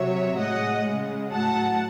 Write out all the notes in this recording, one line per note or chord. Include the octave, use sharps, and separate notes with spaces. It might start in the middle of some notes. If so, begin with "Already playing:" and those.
Already playing: C3 F#3 C#5 E5
A2 G#3 D#5 F#5
C#3 G#3
A2 F#3 F#5 A5